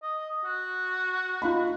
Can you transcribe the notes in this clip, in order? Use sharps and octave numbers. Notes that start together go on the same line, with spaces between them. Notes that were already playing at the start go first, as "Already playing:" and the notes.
D#5
F#4
D#4 F4 B5